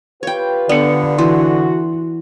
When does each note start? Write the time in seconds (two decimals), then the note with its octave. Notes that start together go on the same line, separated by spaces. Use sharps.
0.23 F4 G4 B4 C#5 G5
0.69 D3 B3 D5 C#7
1.18 E3 F#4 C6